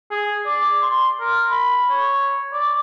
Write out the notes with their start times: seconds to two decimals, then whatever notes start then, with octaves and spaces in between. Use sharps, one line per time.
0.11 G#4
0.46 D5
0.82 C6
1.20 A#4
1.50 B5
1.90 C#5
2.53 D5